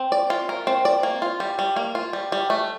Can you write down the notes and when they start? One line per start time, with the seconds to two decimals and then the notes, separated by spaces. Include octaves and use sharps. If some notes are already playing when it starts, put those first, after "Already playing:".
Already playing: C4
0.12 D5
0.30 F4
0.49 A#4
0.67 C4
0.85 D5
1.03 A#3
1.22 F4
1.40 G3
1.59 G3
1.76 A#3
1.95 F4
2.13 G3
2.32 G3
2.50 A3